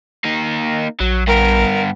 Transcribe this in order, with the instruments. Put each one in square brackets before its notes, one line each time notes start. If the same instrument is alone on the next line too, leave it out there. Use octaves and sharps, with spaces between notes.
[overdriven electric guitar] A#3 D#4
[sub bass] A#1 [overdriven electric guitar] F#3
[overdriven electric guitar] G2 B3 [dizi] A#4